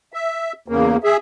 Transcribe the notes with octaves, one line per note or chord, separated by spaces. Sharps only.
E5
E2 C#3 A#3
G#4 E5